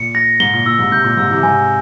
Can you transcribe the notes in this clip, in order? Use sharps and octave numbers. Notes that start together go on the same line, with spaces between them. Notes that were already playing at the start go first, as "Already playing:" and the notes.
Already playing: A#2 C#7
A#6
G#2 G7
A#2
A#2 E6
G#2 C3
G#2 C3 G6
A#2
G#2 C3 E6
C3 E3
G#2 C3 G#5